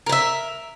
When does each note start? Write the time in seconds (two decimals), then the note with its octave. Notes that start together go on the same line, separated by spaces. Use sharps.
0.06 A#4
0.09 B4
0.12 E5